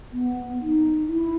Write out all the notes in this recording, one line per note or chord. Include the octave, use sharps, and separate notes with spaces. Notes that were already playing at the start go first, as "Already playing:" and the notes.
B3
D#4
E4